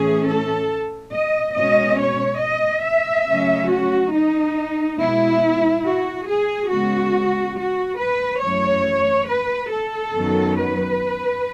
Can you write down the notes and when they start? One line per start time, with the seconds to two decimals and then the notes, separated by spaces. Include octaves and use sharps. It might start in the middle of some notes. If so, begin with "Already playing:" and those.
Already playing: A2 E3 A3 C#4 G#4
0.26 A4
1.13 D#5
1.55 B2 G#3 C#4 D#5
1.99 C#5
2.41 D#5
2.84 E5
3.27 C#3 F#3 A3 C#4
3.70 F#4
4.14 D#4
4.98 B2 G#3 B3 E4
5.84 F#4
6.27 G#4
6.70 C#3 G#3 B3 F#4
7.56 F#4
7.99 B4
8.42 F#2 E3 A3 C#5
9.28 B4
9.71 A4
10.13 F#2 D#3 F#3 B3
10.57 B4